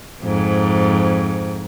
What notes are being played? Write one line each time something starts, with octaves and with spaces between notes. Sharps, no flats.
F2 G#2